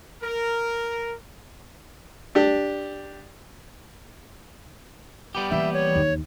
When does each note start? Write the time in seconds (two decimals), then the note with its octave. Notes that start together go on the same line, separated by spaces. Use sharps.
0.22 A#4
2.35 D4 G4
5.35 G3 B3 G4
5.51 E3 A#3 E5
5.73 C#5
5.96 D#2